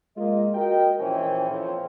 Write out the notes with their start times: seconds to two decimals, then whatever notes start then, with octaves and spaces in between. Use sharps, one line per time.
0.16 G#3 A#3 F4 D#5
0.54 F#4 A#4 D#5 G5
0.99 A#1 E3 C#4 C5 G5
1.50 A#1 F2 F3 C#5